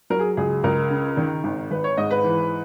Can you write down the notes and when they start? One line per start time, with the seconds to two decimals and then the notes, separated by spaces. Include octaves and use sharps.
0.10 F#3 A#4
0.19 G#4
0.37 C#2 G#4
0.64 C#2 A#4
0.90 C#3
1.17 D#3
1.44 G#1
1.71 G#1 B4
1.84 C#5
1.97 G#2 D#5
2.11 B4
2.24 E3